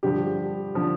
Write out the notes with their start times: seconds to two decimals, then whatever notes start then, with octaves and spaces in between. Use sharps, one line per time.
0.03 G2 D3 F3 G4
0.75 D3 F3